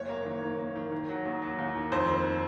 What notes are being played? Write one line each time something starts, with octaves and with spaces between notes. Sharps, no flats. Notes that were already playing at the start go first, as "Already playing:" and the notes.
Already playing: F#1 C#5
A#3
D#3
A#3
A#3
D#3
D#3
F#3
D#2
F#3
D#2
D#3
F2 C5
D#3